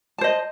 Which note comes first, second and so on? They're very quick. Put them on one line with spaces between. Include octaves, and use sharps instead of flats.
A5 C5 D#5